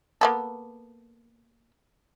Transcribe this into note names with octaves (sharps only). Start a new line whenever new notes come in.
A#3 B3 A4